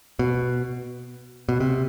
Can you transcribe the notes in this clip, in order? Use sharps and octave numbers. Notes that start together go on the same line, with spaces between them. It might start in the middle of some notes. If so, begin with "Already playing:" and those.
B2
B2
C3